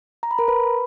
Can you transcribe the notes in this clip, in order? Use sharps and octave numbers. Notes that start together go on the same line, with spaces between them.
A#5
B5
A#4 A#5
B4 B5